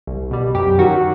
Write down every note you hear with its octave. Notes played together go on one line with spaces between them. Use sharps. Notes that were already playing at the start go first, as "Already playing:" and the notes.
C2
B2 G3
F#2 G4
D#3 F#3 F#4